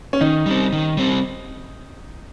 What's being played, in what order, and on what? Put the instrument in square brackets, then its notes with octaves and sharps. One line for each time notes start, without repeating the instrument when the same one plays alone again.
[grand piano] C#4
[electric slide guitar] D#3 [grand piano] D#4
[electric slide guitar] G3 C4
D#3
G3 C4